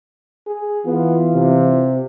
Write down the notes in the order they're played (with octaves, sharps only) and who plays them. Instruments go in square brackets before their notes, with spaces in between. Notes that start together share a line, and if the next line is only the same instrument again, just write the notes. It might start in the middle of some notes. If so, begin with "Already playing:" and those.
[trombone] G#4
[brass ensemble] E3 F4 [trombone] B3
[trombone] C3